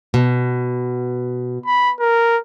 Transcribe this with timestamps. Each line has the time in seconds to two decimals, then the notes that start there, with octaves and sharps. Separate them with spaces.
0.14 B2
1.66 B5
2.00 A#4